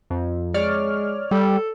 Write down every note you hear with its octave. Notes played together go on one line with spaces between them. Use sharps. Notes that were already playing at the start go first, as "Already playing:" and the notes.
F2
G#3 C#5 D5 F6
G3 A4